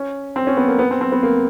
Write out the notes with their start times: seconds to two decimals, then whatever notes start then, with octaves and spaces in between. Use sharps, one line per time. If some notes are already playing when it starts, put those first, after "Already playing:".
Already playing: C#4
0.36 C4
0.47 C#4
0.57 B3
0.68 A#3
0.79 B3
0.91 C4
1.01 C4
1.12 B3
1.23 A#3